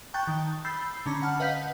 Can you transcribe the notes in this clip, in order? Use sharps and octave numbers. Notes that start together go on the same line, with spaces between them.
G5 A5 C#6 F#6 G6 A6
D#3
B5 E6 G6 A6 C7
D3 C#4 A#5 B5
F#5 A5 F6
B4 D#5 F5 F#5 G6 B6